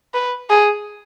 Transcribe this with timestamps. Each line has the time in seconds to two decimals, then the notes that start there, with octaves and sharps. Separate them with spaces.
0.14 B4
0.50 G#4